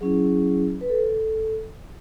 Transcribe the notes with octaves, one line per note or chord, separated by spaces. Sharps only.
F#3 C#4 E4 G#4
B4
A4